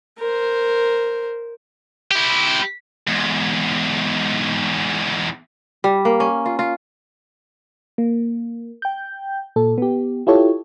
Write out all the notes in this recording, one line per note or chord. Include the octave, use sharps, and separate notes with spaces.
A#4 C5
E4 G4
E2 G#2
G3
A#3
C#4
F4
F4
A#3
G5 G6
A#2 A4
B3 G4
E4 F4 G4 A4 C#5